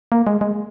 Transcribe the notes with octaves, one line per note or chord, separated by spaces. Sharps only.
A#3
G#3
G#3